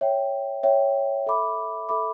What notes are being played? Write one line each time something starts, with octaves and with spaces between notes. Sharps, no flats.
C#5 E5 G5
C#5 E5 G5
A4 E5 B5 D6
A4 E5 B5 D6